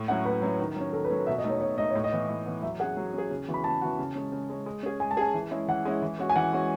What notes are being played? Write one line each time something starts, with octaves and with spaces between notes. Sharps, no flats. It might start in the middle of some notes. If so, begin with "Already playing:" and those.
Already playing: A2
F#3 C#4 E4 F#5
A2 B4
F#3 C#4 E4
D#3
F#3 C#4
D#3 A4
B4
F#3 C#4
B2 E5
D#5
A3 D#4
C#5
D#5
B2 C#5
A3 D#4 D#5
A2 C#5
D#5
E3 B3
A2
E3 B3
F#3 E5
C#4 G#4 F#5
F#3
C#4 G#4
C#3
E3 B3 F#4
B5
C#3 A5
E3 B3 F#4
C#3
G#3 C#4
C#3
G#3 C#4
G#3
C#4 G#4
G#3 G#5
A5
C#4 G#4 G#5
E3
G#3 C#4 E4
E3 F#5
G#3 C#4 E4
E3
G#3 C#4 F#4
G#5
E3 F#5
G#3 C#4 F#4